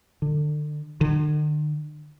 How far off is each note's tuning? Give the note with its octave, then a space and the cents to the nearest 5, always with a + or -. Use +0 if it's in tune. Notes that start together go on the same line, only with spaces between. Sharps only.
D3 +30
D3 +45